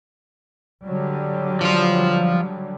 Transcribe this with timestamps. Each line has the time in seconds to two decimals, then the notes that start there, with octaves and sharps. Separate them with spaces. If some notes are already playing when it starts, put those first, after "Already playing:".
0.84 D3 F#3 G3
1.61 F3 F4